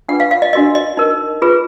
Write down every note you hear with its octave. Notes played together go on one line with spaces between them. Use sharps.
D4 F4 G#4 B4 F#5
F5
F5
D#5
D4 F#4 A#4 D#5
D#5
D#4 A#4
F4 G#4 B4